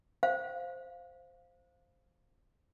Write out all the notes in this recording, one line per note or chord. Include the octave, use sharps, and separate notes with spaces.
C5 F5